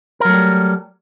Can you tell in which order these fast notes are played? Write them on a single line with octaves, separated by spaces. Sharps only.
A#4 F#3 A3 G3